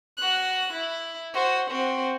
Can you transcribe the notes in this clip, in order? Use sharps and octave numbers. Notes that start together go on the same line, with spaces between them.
F#4 F#6
E4
F#4 C5
C4 F#4